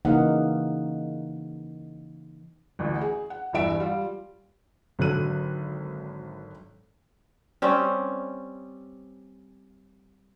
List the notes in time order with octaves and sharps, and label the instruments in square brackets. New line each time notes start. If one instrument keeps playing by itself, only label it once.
[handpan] C#3 E3 A#3 D#4 F5 F#5
[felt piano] A1 D2
G#4
F#5
E1 G2 E3 E5 D7
G3 F4
[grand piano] G#1 D3 F#3 A4 F#6 D#7
[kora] G3 C4 C#4